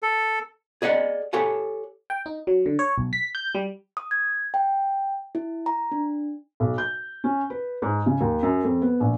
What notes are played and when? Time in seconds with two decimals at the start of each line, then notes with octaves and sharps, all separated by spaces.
0.03 A4
0.82 G#4 D5 D#5 F#5
1.33 G4 A4 C#5 F#5 G#5
2.10 G5
2.26 D#4
2.47 F#3
2.66 D3
2.79 C#5
2.98 B1
3.13 B6
3.35 G6
3.55 G3
3.97 D#6
4.11 G#6
4.54 G5
5.35 E4
5.66 A#5
5.92 D4
6.60 B1
6.78 G6
7.24 C#4
7.50 B4
7.82 G#2
8.06 C#3
8.21 D#2
8.43 F#2
8.64 F2
8.82 B3
9.00 A#1